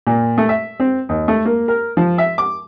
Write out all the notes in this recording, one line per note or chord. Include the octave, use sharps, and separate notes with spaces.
A#2
A3
E5
C4
D#2
A3
A#3
A#4
F3
E5
D6